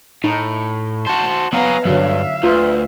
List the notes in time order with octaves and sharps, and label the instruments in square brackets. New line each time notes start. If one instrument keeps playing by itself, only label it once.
[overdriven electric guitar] A2 [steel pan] D#4
[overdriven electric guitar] F#4 C5 [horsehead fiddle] A5
[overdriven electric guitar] F#3 G#4 [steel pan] B3 [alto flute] B4 [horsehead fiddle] F5 A#5
[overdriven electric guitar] G2 [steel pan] D3 F#3 [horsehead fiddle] E5 F5
[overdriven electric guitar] D2 [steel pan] F4 [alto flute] B4